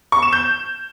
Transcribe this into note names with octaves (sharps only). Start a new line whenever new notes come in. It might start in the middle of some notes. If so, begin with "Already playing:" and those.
C#6
E7
G6